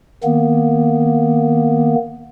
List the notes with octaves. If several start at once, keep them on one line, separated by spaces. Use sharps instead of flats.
D#3 A#3 B3